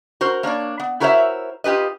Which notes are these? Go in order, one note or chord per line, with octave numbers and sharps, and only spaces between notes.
F#4 A#4 C5
A#3 D4 C#5 D5
B3
E4 F#4 A#4 C5 C#5 E5
F4 G4 G#4 B4 D#5